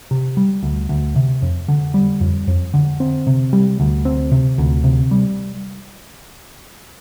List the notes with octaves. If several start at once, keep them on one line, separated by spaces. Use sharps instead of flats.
C3
G3
D2
D2
C3
F2
D3
G3
F2
F2
D3
C4
C3
G3
D2
C4
C3
D2
C3
G3